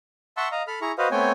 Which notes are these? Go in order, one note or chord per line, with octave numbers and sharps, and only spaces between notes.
E5 F#5 A5 C6 C#6 E6
D#5 F5 A#5
A4 B5 F6
E4 G#4 A#5 C#6
F#4 B4 C5 D#5 F5
A3 B3 C4 C#5 G5 G#5